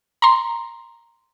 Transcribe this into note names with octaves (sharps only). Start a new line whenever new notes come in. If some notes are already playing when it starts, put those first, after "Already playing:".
A#5 C6